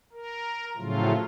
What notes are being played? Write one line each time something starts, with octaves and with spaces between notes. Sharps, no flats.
A#4
A2 C#3 F3 F#3 A3 F4